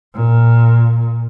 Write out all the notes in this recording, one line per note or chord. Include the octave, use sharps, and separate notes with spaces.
A#2